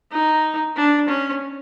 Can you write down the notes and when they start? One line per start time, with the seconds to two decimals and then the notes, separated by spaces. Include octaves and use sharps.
0.12 D#4
0.76 D4
1.08 C#4